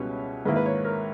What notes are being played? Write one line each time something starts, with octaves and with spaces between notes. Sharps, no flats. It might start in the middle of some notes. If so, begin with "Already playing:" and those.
Already playing: C#2 B2 G3 C#4 E4 B4 C#5
G#2 D#3 A#3 E4 B4
B4
C#5
A#4